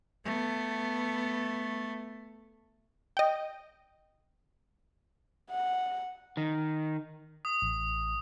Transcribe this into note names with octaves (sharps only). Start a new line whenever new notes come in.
A3 B3
D#5 G5
F#5
D#3
D#6
A1